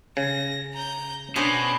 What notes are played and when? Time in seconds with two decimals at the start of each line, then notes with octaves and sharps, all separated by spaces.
0.17 C#3 A#6
0.74 A#5 G6
1.36 B2 C#4 D4 G#4 C5 G6